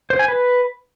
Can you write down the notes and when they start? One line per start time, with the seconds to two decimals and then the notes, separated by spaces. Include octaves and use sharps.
0.10 C5
0.19 G#5
0.28 B4